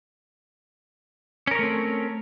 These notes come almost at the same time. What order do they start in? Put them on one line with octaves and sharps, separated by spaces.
C#4 A#4 C#5 A3 C4